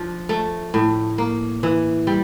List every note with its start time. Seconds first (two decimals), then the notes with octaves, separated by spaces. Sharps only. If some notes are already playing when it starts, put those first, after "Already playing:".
Already playing: F3 D4
0.29 A3
0.74 A2
1.18 A#3
1.63 E3
2.07 G3